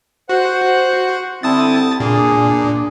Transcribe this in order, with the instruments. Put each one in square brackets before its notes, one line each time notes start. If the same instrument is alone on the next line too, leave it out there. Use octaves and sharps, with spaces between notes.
[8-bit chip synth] F#4 [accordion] C5 F#5 F#6
[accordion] D3 G3 E4 [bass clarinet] C4 [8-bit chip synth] A5 D#6 A6
[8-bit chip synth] A#2 [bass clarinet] D4 [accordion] G#4